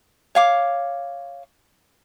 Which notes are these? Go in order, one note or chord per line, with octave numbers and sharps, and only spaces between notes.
C#5 F5 D6